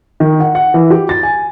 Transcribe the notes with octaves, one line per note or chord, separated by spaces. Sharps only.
D#3
F#5
F#5
E3
G4
A6
G#5